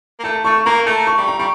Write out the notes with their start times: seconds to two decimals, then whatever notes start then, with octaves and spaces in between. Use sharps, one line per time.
0.19 A#3
0.24 A3 A5
0.44 A3 C#6
0.66 A#3 A#5
0.86 A3 A5
1.07 C#6
1.17 G3
1.28 A#5
1.39 G3 C#6